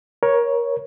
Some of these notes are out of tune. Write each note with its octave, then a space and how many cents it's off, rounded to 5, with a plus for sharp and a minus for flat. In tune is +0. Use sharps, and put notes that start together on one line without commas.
A#4 +25 C#5 +0